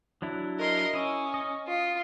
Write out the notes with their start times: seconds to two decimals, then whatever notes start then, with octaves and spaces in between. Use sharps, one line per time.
0.22 F#3 D4 E4
0.59 A#4 D#5 C6
0.93 C#4 E4 D#5
1.34 D#5
1.67 F4